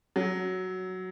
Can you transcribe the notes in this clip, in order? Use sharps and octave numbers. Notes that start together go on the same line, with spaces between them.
F#3